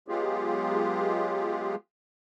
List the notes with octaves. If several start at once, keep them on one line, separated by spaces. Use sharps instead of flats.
F#3 G#3 B3 F4 G4 G#4